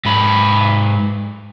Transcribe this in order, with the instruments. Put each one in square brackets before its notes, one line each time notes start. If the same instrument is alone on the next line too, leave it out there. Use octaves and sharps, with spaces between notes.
[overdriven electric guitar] G#2 B4